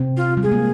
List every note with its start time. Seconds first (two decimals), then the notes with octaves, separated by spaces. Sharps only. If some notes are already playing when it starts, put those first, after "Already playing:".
Already playing: C3 C4
0.17 F4
0.37 G3
0.43 G#3 G#4
0.52 A#3